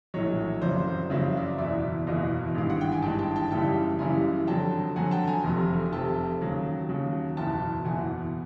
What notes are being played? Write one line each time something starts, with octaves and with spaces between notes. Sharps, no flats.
A#1 A2 F#3 C#5 D#5
F#1 F2 C#3 F#3 C5 D5
F#1 F2 C#3 F#3 E5
F5
D5 E5
F#1 E2 B2 D5 E5
F#1 E2 B2 D#5 F5
G#1 G2 E3 G#3 F5
F#5
G5
G#5
G#1 G2 E3 G#3 G5 A5
G5 A5
G5 A5
F#1 F#2 C#3 E3 G3 G5 A5
F#1 F#2 C#3 E3 G3 G#5 A#5
F2 D3 F#3 G5 A5
F2 D3 F#3 F#5 G#5
G5 A5
G#5 A#5
F1 F2 C3
F1 F2 C3 G5 A5
D#2 C#3 F#3
D#2 C#3 F#3
F#1 E2 B2 G5 A5
F#1 E2 B2 F#5 G#5